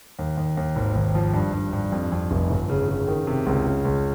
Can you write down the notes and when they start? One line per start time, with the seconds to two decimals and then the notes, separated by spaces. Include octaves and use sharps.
0.19 D#2
0.37 D#2
0.57 D#2
0.76 G#1
0.95 G#1
1.15 F3
1.34 G2
1.53 G2
1.73 G2
1.92 F2
2.12 F2
2.31 F1
2.50 G1
2.69 C#3
2.89 C#3
3.08 D#3
3.27 C3
3.46 C#2
3.66 C#3
3.85 C#2